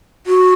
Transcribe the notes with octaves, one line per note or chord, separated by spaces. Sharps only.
F#4